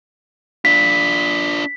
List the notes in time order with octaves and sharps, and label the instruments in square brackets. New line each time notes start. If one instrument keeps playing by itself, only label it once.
[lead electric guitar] D4 F4 [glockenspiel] B6